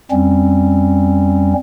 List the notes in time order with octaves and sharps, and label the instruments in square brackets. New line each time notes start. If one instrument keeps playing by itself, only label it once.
[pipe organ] F2 G3 C4 C#4